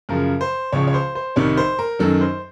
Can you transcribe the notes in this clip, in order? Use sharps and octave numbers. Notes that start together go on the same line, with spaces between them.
F#2 C#3 F3 A#4
C5
C#2 C#3 F3 C#5
C#5
C5
C5
C2 C3 D#3 C#5
C5
A#4
F#2 D#3 F#3 A4
C5